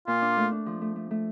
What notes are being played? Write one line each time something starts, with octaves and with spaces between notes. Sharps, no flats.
A#2 F4
D4
A3
D4
F3
A3
A3
A3